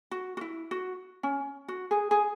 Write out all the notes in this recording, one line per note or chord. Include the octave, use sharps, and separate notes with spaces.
F#4
F#4
E4
F#4
C#4
F#4
G#4
G#4